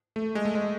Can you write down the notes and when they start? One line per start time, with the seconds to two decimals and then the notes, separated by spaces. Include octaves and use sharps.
0.16 A3
0.35 G#3
0.45 A3
0.55 G#3